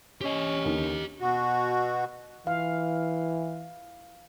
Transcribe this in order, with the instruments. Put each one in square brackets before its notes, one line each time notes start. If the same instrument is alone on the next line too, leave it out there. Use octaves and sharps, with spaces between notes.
[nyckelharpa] C#4 [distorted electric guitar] G4 D#5
[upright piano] D#2 D3
[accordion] B2 F#4
[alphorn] E3 [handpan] F5